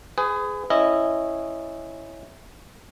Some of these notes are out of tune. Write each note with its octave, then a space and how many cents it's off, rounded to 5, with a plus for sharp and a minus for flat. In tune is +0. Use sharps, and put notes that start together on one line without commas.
G#4 +0 B4 +40
C#4 -10 E4 +0 D#5 -15